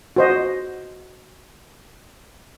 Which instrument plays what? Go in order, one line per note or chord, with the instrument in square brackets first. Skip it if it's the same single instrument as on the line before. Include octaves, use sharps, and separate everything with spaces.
[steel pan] F#4 C5 D#5